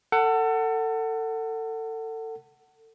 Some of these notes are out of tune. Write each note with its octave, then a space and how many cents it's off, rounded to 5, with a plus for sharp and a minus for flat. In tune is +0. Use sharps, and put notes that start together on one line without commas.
A4 +30 F#5 +15